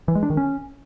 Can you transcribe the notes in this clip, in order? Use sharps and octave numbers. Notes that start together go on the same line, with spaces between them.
E3
G#3
D4
D#3
C#4